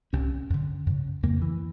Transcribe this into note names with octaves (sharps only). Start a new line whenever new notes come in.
C2 C3 C#4
F#2 D3
F#2 C#3
F2 C#3 A#3
E3